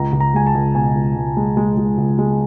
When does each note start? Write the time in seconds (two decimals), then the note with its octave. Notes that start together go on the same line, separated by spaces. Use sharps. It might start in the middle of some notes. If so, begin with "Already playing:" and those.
Already playing: C#2 A#5
0.12 C#2
0.20 A#5
0.34 G#3 G#5
0.47 A5
0.55 C#2
0.75 B2 G#5
0.95 C#2
1.16 C#2
1.37 G#3
1.57 G#3
1.77 G#3
1.98 C#2
2.19 G#3